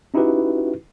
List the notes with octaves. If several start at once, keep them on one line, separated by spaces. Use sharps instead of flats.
C#4 D#4 E4 F#4 G4 B4